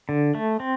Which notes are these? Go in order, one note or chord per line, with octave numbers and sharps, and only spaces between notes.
D3
A3
C4